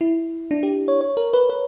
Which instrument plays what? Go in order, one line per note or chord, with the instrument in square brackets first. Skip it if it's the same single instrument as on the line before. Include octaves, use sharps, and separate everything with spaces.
[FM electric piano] E4
D4
G4
C#5
C#5
A#4
B4
B4